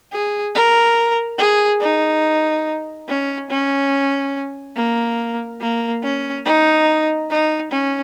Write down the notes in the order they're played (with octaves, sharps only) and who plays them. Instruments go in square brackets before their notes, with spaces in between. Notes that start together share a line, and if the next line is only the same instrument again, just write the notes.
[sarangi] G#4
A#4
G#4
D#4
C#4
C#4
A#3
A#3
C#4
D#4
D#4
C#4